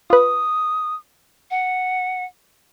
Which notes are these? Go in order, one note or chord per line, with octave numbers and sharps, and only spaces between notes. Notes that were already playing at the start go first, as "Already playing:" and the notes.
F4 B4 D#6
F#5